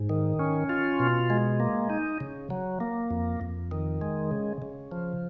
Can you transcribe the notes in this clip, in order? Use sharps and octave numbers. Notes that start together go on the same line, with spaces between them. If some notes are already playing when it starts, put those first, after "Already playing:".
Already playing: G#2
D#3
C#4
F4
B2
G#3
A#3
D#4
C#3
F#3
A#3
F2
F2
D#3
G#3
C#3
C#3
F3